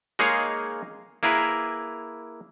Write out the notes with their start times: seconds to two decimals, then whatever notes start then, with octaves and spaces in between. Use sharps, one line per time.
0.19 G#3 A#3 D#4 G#4 C#5 F5
1.23 A#3 E4 G#4 A#4 B4